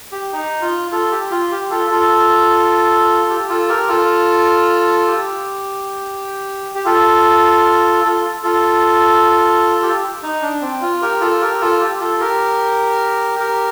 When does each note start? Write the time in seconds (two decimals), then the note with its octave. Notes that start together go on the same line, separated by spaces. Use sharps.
0.12 G4
0.33 D#4
0.61 F4
0.91 F4 A4
1.11 G4
1.31 F4
1.51 G4
1.70 F4 A4
1.90 F4 A4
3.30 G4
3.49 F4 A4
3.68 G4 A#4
3.88 F4 A4
5.07 G4
6.75 G4
6.85 F4 A4
8.04 F4 A4
8.43 F4 A4
9.83 G4
10.23 D#4
10.42 D4
10.61 C4
10.81 F4
11.01 G4 A#4
11.21 F4 A4
11.41 G4 A#4
11.61 F4 A4
11.80 G4
12.00 F4 A4
12.20 G4 A#4
13.39 G4 A#4